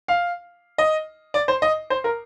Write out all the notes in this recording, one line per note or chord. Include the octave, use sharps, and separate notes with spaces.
F5
D#5
D5
C5
D#5
C5
A#4